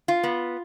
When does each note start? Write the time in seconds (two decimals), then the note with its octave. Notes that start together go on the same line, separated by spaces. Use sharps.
0.08 F4
0.23 B3